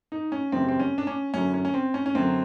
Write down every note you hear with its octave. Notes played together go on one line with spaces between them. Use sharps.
D#4
C#4
F#2 C#3 E3 G3 C4
C4
C#4
D4
C#4
F#2 D3 F#3 C#4
C#4
C#4
C4
C#4
C#4
F#2 D3 F#3 C4